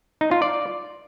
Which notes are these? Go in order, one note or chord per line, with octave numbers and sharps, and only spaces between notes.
D#4
F4
D5